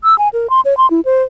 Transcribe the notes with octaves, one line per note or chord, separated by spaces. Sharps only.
E6
G#5
A#4
C6
C#5
C6
E4
C5